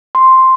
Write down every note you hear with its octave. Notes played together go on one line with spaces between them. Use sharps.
C6